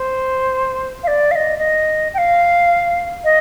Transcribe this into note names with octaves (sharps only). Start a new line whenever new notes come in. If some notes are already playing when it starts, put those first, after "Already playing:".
Already playing: C5
F5
D5
F5
D#5
D#5
G5
F5
D#5